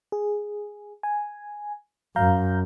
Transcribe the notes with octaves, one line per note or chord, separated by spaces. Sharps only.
G#4
G#5
F#2 F5 A#5 G6